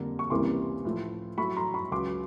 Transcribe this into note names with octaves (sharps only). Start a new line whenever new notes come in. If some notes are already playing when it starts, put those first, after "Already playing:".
Already playing: F2 D3 G3 A#3
C#6
C#2 C3 E3 G3 A#3 C6 D6
A2 F3 A3
A2 F#3 A3 B5 C#6
A#5 C6
B5 C#6
C#2 C#3 F#3 C6 D6